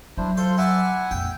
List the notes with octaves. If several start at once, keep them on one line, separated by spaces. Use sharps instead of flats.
F#3 D4 E4 C5
F4 A4 C5 C6
E4 D5 E5 F#5 G#5
A#1 F2 G5